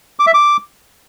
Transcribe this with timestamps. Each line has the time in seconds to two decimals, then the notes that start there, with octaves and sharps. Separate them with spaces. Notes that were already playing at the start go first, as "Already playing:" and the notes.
0.19 D6
0.27 E5
0.34 D6